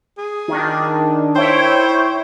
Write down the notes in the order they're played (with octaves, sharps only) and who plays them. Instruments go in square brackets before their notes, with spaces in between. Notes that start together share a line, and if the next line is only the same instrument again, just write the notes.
[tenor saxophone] G#4
[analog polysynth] D#3 D4
[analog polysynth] E4 C#5 G5 [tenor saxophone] C5